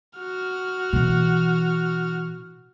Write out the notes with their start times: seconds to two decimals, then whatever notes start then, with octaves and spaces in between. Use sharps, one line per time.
0.19 F#4 F6
0.93 B2 E3